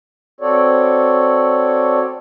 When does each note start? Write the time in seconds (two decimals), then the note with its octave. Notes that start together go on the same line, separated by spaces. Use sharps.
0.41 C4 F#4 A4 C#5 D5